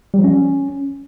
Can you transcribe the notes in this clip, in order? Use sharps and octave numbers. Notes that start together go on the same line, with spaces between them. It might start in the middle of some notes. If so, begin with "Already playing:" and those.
G3
F3
C#4